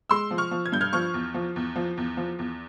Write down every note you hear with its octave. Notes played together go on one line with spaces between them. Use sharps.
G#3 C6 E6
F3
C#6 F6
F3
G#6
G2 G6
F6 G#6
F3 C#6 F6
E2
F3
E2
F3
E2
F3
E2